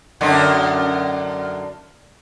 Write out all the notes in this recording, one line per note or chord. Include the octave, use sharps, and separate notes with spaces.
F#2 D3 D#4